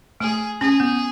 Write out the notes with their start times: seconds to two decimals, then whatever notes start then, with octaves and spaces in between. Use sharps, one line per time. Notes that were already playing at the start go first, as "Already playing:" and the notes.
0.20 A3 G#4
0.61 C#4 G#4
0.80 B3